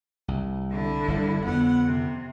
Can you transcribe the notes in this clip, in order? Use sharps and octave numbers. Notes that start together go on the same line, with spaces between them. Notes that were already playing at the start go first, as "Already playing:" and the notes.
C2
D3 E4
G1 G3
F2 D3 B3 F#5
C3